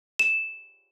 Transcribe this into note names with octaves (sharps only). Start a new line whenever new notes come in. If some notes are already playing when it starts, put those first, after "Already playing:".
E7